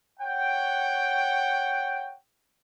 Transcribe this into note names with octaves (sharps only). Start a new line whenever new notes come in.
C#5 F#5 G5